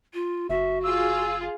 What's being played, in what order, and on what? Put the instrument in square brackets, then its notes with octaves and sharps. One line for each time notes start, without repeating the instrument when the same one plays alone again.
[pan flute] F4
[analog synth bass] F#1 [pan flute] F#4 [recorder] E5
[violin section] F4 G#4 [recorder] E6